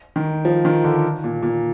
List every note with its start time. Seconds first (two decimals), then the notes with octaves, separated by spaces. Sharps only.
0.16 D#3
0.45 F3
0.65 D#3
0.84 D3
1.24 A#2
1.42 A#2